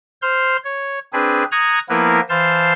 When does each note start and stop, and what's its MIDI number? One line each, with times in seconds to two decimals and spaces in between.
0.22 0.57 72
0.22 0.57 84
0.22 0.57 89
0.64 0.99 73
1.13 1.44 60
1.13 1.44 62
1.13 1.44 68
1.13 1.44 71
1.52 1.79 82
1.52 1.79 85
1.52 1.79 87
1.52 1.79 90
1.52 1.79 92
1.89 2.20 53
1.89 2.20 58
1.89 2.20 59
1.89 2.20 64
1.89 2.20 70
1.89 2.20 71
2.30 2.73 52
2.30 2.73 72
2.30 2.73 77
2.30 2.73 81
2.30 2.73 84